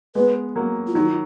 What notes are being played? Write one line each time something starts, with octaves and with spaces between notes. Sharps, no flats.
G#3 B3 B4
F#3 A#3
F4
D#3 F#3 D#4
F4